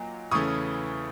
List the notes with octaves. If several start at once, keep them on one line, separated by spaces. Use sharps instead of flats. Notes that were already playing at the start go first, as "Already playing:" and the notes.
Already playing: A#2 F#3 D#4
E2 C#3 E3 A3 C#4 C#6 D#6